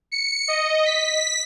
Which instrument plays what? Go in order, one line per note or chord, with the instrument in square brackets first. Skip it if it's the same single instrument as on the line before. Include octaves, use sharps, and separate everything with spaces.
[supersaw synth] C#7
D#5
B6